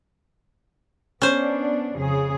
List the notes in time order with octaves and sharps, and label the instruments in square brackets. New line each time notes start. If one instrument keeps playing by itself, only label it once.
[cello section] B3 D4 [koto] C#4 C5
[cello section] F2 C#3 G#4